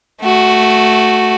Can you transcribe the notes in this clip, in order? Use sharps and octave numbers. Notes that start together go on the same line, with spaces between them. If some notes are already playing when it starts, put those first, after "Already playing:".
A3 F#4